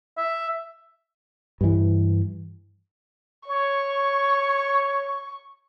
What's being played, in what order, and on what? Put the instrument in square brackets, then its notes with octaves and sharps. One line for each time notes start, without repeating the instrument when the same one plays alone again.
[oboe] E5
[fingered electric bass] G2 E3
[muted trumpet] C#5 [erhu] C#6